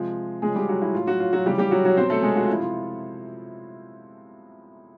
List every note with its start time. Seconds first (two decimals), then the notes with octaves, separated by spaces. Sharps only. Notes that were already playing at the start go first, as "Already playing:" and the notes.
Already playing: C3 F3 G#3
0.42 C#3 F3 G#3 G#4
0.55 G3 G4
0.68 F#3 F#4
0.82 E4
0.95 A2 F#3 F4
1.07 F#3 F#4
1.20 F4
1.33 F#3 F#4
1.46 C#3 E3 G3 G4
1.58 G3 G4
1.71 F#3 F#4
1.85 F#3 F#4
1.97 B2 F#3 C4 C5
2.10 A3 A4
2.23 G#3 G#4
2.36 F#4
2.44 F4
2.50 C3 F3 E4
2.60 F4